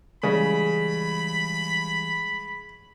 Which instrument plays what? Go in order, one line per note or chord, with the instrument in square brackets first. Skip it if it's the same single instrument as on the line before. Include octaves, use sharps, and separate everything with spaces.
[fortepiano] C#3 [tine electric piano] E3 G3 G#3 [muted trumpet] B5